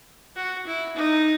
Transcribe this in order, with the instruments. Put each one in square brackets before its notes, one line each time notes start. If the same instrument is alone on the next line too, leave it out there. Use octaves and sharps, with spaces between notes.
[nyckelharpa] F#4
E4
D#4